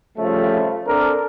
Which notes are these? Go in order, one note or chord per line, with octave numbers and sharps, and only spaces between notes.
C#3 F3 G3 A3
C4 D4 A4 A#4